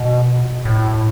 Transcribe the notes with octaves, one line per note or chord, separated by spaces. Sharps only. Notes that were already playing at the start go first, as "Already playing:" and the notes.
Already playing: B2
A2